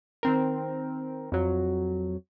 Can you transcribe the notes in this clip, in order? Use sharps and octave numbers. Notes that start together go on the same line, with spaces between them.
D#3 C4 A#4
F2 F#3